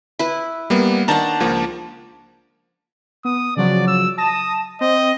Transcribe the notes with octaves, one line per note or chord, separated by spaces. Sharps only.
E4 B4
G3 A#3 B3
D#3 D4 F#5 A5 A#5
C#2 F3 A#3
B3 D#6
C#3 F3 F#3 D5
E6
A5 D#6 A#6 E7
C4 D#5